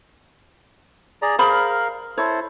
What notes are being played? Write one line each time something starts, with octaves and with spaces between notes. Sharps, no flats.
G#4 D5 A#5
G#4 A#4 C5 F5 B5
E4 A4 C5 C#5